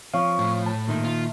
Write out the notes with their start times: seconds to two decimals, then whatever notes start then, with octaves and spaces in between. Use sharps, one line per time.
0.14 F3 C4 C#5 F5 C#6
0.39 A2
0.66 C#5 A5
0.88 A#2 D#3 D#4 E5
1.04 F4